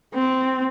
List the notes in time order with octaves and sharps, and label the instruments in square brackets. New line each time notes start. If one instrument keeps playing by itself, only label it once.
[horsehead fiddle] C4